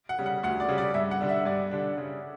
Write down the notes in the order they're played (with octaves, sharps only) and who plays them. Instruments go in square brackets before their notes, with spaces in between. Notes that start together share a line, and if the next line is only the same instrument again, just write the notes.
[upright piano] F#5
[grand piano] C#3 G3
[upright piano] F#5
[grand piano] D2 [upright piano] F#5
[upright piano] D5
[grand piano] C#3 G3
[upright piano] D5
[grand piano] G2 [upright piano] E5
[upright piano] F#5
[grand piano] D3 G3 D4
[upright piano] E5
[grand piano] G2 [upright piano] D5
[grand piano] D3 G3 D4
C#3